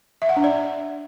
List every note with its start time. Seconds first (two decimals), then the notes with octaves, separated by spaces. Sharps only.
0.22 E5
0.29 F#5
0.36 D4
0.44 D5